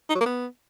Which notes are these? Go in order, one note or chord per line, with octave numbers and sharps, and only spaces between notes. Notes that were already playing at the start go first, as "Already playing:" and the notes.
D#4
F#3
A#3
B3